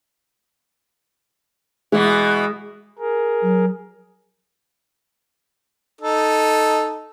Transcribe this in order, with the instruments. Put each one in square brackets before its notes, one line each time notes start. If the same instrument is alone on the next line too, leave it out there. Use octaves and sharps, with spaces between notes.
[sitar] B2 E3 [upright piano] G#3
[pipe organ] G#4 A#4
[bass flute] F#3
[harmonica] D#4 A4